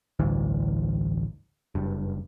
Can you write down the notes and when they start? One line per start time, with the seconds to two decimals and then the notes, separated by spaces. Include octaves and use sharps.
0.19 A1 D2 G2 E3
1.75 F#1 G2